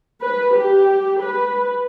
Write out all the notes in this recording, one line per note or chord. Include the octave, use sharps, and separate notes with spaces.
B4
G4
B4